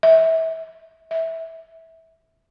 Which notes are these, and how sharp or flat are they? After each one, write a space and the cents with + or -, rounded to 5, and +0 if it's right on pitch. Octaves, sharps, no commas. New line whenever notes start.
E5 -25
E5 -15